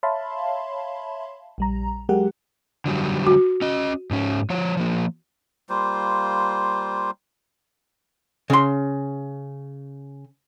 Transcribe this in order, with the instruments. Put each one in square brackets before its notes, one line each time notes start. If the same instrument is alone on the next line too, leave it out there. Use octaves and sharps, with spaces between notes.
[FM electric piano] C#5 E5 F5 A5 B5 C6
A#1 G3 A#5
F#3 G#3 G4 A#4 F#5
[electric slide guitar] D3 F#3 G3
[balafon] F#4
[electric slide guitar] C#4 D#5
G#2 C#4
F3 C#5
F3 A#3
[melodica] G3 A#3 F4 C5
[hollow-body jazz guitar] C#3 C6